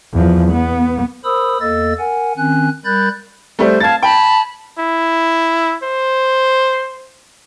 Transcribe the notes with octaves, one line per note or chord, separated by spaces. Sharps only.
E2 F3
B3
A#4 C5 B5 D#6 E6
E2 A#3 A4 D#5 E6 A6
A#4 F#5 G#5
D#3 C4 C#4 G#5 F#6
G3 A#4 B5 F#6 G6 A6
G3 A3 C5
F5 A5 G#6 A6
G5 A5 B5
E4
C5